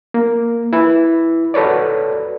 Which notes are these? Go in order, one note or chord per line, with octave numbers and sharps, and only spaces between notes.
A#3
E4 B4
F#4 A4 B4 C#5 D5